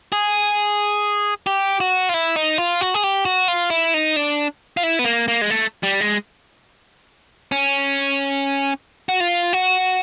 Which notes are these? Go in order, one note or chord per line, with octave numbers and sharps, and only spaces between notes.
G#4
G4
F#4
F4
E4
D#4
F4
F#4
G#4
G4
F#4
F4
E4
D#4
D4
F4
E4
B3
A#3
A#3
G#3
A3
G3
G#3
C#4
F#4
F4
F#4